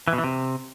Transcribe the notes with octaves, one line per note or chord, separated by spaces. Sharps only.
E3
B2
E3
C3